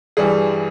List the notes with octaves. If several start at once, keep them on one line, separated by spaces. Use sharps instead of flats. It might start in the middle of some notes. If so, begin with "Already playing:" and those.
G2 E3 G3 G#4